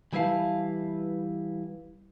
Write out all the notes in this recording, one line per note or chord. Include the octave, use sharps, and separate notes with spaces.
E3 G3 E4 B4 F5 A5